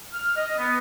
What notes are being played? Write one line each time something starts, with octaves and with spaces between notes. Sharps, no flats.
F6
D#5
B3